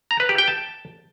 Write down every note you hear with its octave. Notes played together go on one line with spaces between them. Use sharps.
A#5
B4
G4
G5
A5